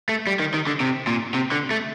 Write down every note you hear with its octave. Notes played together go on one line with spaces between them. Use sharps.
A3
G3
D#3
D#3
D3
C3
A#2
C3
D3
A3